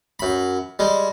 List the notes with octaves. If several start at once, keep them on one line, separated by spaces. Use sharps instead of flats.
F#2 B5
G3 G#3